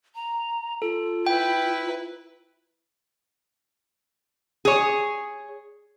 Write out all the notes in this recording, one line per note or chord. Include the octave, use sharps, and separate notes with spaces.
A#5
F4 A4
E4 B4 G5
G#4 C#5